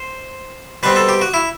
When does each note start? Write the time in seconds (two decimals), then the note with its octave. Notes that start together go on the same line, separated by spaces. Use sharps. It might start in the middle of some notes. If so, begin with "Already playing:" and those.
Already playing: C5
0.83 B2 G3 C4 B4
0.96 A4
1.09 G4
1.21 F#4
1.34 E4